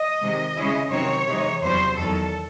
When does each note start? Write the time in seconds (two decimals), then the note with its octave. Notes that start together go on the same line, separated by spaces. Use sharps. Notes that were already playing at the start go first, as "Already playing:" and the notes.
Already playing: D#5
0.20 C3 D#3 G#3
0.56 C#3 G#3 C#4 E4
0.90 C3 D#3 F#3 C4 D#4 C#5
1.26 C3 E3 G#3 D#4
1.61 E2 C3 F#3 C#4 C5
1.96 E2 D#3 F#3 A4